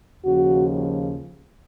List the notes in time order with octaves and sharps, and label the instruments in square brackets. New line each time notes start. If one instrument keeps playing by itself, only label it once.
[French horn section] D#2 C#3 F3 F#4